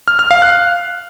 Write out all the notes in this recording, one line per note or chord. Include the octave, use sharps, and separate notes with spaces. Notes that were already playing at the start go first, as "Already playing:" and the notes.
F6
F6
F5
F#6